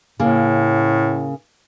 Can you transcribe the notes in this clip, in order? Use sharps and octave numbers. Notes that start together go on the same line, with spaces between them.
A2 C#3 A#3